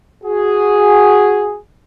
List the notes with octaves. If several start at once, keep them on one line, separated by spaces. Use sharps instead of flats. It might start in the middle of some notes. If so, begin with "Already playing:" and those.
F#4 G#4